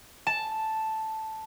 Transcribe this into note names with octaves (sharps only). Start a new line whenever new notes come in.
A5